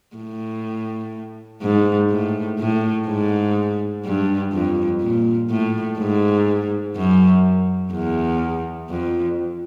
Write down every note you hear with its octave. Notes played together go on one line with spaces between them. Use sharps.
A2
G#2
A2
A2
G#2
G2
F2
A#2
A2
G#2
F#2
E2
F2